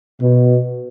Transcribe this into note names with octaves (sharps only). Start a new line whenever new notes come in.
B2